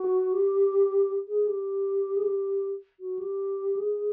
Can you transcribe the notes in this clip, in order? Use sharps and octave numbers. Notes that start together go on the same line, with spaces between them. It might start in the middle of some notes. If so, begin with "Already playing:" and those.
Already playing: F#4
G4
G#4
G4
G#4
G4
F#4
G4
G#4